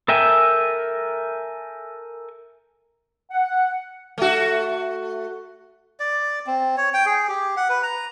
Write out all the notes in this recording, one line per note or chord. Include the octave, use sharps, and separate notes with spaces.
A4 A#4 E5 G5 G#5
F#5
A3 F#4
D5
C4
C#5
G5
G#4
G4
F#5
B4
A#5